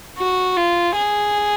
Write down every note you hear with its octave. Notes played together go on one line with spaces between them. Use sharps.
F#4
F4
G#4